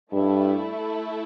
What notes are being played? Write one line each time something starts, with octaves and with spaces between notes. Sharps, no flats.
G2 A3 E4 A4